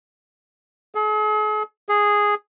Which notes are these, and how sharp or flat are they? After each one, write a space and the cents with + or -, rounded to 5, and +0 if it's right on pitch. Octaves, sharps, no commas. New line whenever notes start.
G#4 +45
G#4 -5